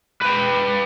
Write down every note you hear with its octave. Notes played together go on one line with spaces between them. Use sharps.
B4 G5